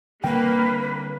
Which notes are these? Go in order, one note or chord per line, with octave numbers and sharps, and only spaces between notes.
D3 G3 A#3 C4 B4 G5